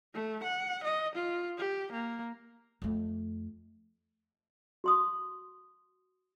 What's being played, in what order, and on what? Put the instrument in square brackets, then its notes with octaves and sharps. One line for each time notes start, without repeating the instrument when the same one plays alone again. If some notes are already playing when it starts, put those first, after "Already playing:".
[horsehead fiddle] A3
F#5
D#5
F4
G4
A#3
[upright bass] F2 A3
[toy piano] F#4 C6 D#6